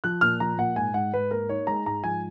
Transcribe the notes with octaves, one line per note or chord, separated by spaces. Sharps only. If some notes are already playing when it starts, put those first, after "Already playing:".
F3 F#6
A#2 F6
F3 A#5
A#2 F#5
G#2 G#5
G#2 F#5
G#2 B4
A#3 A#4
D#4 C#5
G#3 A#5
G#2 A#5
F3 G#5